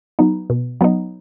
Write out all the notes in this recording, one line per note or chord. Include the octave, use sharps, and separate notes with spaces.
F#3 B3 D#4
B2
F#3 B3 D#4